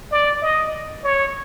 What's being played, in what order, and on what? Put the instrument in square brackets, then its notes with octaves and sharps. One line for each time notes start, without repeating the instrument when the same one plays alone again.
[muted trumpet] D5
D#5
C#5